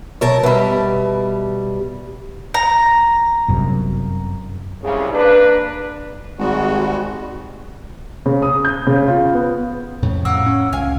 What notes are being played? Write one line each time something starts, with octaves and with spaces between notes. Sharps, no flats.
F#2 B2 A#4 C#5 A5
B2 G3 B4 E5 B5
A#5
G1 F#2 C3
C2 C#3
A#3 D4 B4
G#1 G3 G#3 F#4
C#3
D#6
G6
C#3
F4
B3
F2 A2 C#3
A#3 F#5 E6
C#4
C#2 F5 G#5